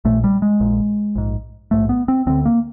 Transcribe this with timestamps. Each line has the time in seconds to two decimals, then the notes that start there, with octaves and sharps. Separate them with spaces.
0.05 A#1 A#2 A3
0.24 G3
0.42 G#3
0.60 A#1 A#2
1.15 A#1 G#2
1.71 A#1 G#2 A3
1.89 B3
2.08 C4
2.27 D2 D3 C4
2.46 A#3